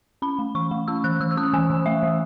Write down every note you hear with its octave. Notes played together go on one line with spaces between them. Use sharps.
C#4 B5
A3
E3 C#6
A3
C#4 E6
E3 F#6
E3 E6
E6
C#4 D#6
E3 G#5
E3
A3 E5
E3